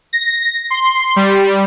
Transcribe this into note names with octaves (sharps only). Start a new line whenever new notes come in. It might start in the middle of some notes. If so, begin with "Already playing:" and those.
A#6
C6
G3